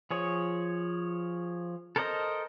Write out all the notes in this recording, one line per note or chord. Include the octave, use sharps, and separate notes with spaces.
F3 G#4 C#5
A4 A#4 C5 D5 D#5